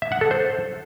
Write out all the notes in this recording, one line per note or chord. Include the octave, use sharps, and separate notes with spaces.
E5
F#5
A4
C5